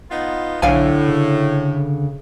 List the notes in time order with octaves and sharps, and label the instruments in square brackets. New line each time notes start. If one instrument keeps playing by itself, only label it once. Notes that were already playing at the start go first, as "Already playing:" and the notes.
[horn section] B3 D#4 F4
[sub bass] B1 [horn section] A2 [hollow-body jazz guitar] D3 F5 G#5
[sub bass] C#3